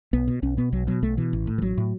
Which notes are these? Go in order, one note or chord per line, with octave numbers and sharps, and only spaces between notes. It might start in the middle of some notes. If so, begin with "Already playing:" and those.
B1 B3
B2
B1 C#4
B2 B3
B1 F#3
B2 F#3
B1 A3
B2 E3
A1
A2
E3
A1 F#3
A2